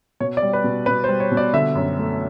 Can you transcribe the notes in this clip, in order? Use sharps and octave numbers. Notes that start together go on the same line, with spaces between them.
B2 C#5
D5
G3
B4
B2
B2 B4
C5
G3
C#5
B2
D5
D3 E5
F#2
A3